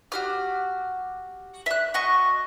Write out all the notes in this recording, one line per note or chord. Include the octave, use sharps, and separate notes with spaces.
F#4 G4 F6
E5 F#6
F#4 D#5 C#6